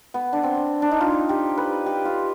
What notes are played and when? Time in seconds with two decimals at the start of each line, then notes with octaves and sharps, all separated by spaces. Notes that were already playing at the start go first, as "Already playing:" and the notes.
0.14 B3
0.33 D4
0.43 C4
0.82 D4
0.91 D#4
1.00 F4
1.29 G4
1.58 B4
1.86 G4
2.05 F4